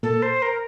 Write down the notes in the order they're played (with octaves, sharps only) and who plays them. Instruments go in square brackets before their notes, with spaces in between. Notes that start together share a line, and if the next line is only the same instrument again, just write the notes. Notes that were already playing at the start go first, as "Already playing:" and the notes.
[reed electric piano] A#2 A#3 [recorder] A4
[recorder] C5
A#4